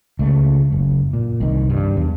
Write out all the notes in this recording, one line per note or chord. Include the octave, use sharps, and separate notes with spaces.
C#2 A3
F#1
A#2
C2 D#3
G2
E2 G2